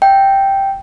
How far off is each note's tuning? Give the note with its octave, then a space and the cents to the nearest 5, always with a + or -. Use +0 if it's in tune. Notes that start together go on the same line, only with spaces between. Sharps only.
E5 +0 G5 +0